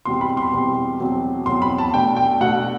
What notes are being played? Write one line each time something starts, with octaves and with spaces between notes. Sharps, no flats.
E2 B2 G3 C4 C6
B5
C6
E2 B2 G3 C4
E2 B2 F#3 C4
E2 B2 F#3 C4 C6
B5
A5
B2 A3 D4 G5
G5
B2 A3 D4 F#5